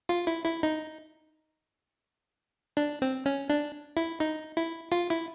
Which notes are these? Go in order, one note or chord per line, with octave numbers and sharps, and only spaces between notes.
F4
E4
E4
D#4
D4
C4
C#4
D4
E4
D#4
E4
F4
E4